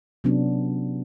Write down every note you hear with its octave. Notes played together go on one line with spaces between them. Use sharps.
C3 F#3 B3 C#4 D4